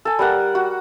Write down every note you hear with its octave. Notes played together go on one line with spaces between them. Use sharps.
A4 G#5
G3 A#4 F#5
F#4